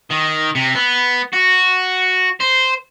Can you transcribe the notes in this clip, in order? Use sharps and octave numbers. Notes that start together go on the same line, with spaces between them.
D#3
C3
B3
F#4
C5